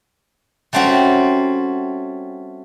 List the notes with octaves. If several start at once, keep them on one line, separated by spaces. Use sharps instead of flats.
G3 A3 C4 C#4 F#4